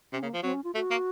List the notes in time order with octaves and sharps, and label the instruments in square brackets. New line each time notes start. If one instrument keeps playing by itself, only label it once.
[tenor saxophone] C3 [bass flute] C#4
[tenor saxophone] C#3 [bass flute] A#3
[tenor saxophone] F3
[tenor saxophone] F#3 [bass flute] C4
[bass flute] C#4
F4
[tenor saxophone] A3 [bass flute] F#4
[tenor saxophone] A#3